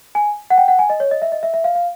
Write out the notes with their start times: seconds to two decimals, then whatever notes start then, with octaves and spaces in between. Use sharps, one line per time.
0.15 G#5
0.50 F#5
0.58 G5
0.68 F#5
0.79 G#5
0.90 D#5
1.00 C#5
1.11 D#5
1.22 E5
1.32 D#5
1.43 E5
1.54 E5
1.64 F5
1.75 F5